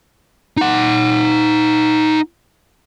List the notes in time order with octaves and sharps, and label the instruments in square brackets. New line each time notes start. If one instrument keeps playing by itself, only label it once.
[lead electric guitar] D#4 F#5